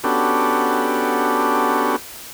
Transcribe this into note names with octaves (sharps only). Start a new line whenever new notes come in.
B3 C#4 D4 F#4 G4 A4